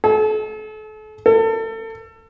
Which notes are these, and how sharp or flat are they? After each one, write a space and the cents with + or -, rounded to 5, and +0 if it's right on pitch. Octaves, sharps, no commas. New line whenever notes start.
A4 -40
A4 +30